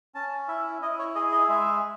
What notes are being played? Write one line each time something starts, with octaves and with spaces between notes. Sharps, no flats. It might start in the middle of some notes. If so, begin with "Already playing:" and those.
C#4 A5
E4 E5
E4 D#5
C#5
G#4 D#5
D#5
G#3 E5